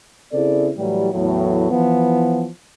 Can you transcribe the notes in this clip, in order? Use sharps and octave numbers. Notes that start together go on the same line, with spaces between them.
C#3 C4 E4 G#4 A4 D5
A2 E3 F#3 G3
E2 A2 F#3
E3 F3 B3